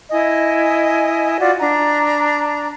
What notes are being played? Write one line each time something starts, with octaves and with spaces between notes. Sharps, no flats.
E4 D#5 G#5
F4 F#4 D5
D4 A#5